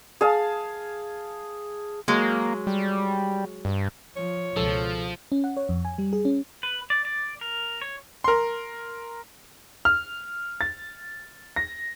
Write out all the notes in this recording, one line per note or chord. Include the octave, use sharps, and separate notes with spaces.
G#4 F5 A5
F#3 G#3 A#3
G3
G2
F3 C#5
C#2 B2 F3 A4
C#4
F#5
C#5
F2
G#5
G3
G#4
C#4
B4
D5
D5
A#4
C#5
A#4 C6
F6
A6
A#6